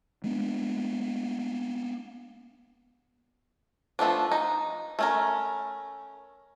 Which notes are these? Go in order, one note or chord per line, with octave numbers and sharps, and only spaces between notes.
G#3 A#3 B3 D4
F3 A3 B3 D4
D#4
A3 C#4 A#4